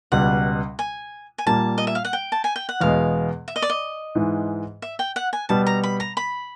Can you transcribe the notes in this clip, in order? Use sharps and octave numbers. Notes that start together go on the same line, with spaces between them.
C#2 B2 G3 F#5
G#5
G#5
A#2 G3 A#3 A5
D#5
E5
F5
F#5
G5
A5
G#5
G5
F#5
E2 B2 G#3 B3 F5
E5
D#5
D5
D#5
G#2 E3 G#3
E5
G5
F#5
G#5
B2 G3 B3 A5
A#5
B5
A#5
B5